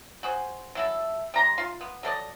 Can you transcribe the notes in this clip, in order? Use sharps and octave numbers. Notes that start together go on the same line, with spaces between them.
F#4 G#4 C5
F#3 E4 A4
G3 A#5 C6
F4 C6
B3
F#3 A4 D5 D#5